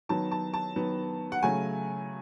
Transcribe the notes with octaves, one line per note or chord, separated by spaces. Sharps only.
D#3 F#3 B3 A5
A5
A5
D#3 F#3 B3
F#5
C#3 F#3 A3 G#5